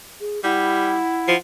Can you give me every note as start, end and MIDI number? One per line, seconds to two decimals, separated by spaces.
0.20 0.40 68
0.44 0.99 55
0.44 1.35 64
0.44 1.38 78
1.28 1.36 53